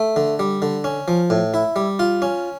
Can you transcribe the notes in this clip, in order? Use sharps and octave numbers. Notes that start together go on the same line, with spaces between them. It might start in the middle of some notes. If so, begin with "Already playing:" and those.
Already playing: A3
D3
G3
D3
C#4
F3
A2
E4
G3
F4
C#4